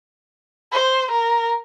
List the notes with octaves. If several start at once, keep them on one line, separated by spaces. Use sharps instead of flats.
C5
A#4